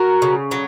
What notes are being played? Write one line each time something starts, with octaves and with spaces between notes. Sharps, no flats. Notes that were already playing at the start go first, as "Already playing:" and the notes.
Already playing: F#4 A#4
C#3
F#3